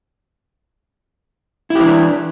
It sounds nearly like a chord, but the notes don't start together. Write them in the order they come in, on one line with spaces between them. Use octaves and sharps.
E4 G4 E3 D4